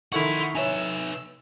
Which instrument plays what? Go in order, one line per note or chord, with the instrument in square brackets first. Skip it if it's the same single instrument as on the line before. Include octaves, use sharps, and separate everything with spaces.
[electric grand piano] D#3 A4 C#6 [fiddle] E4 [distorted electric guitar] F#5 C6
[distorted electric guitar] D#4 B4 [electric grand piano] C#5 E5 G#5 [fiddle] E6